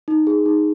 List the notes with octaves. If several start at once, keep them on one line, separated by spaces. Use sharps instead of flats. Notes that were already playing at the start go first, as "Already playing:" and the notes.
D#4
G#4
D#4